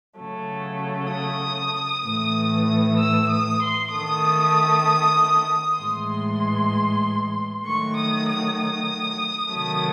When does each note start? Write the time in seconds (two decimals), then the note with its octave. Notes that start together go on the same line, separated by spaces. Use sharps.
0.19 C#3 F#3 A3
1.12 D#6
2.06 A2 E3 A3
2.99 E6
3.30 D#6
3.62 C6
3.92 D#3 A3 D#6
5.79 A2 E3 G#3 C6
7.65 D#3 F#3 A3 C#6
7.97 D#6
8.28 D#6
8.58 D#6
9.52 C3 D#3 F#3 A3